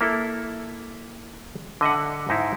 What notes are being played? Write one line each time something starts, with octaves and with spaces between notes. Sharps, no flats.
A#3 E4 A4
D3 D#5 E5 F#5
G#2 D#4 E4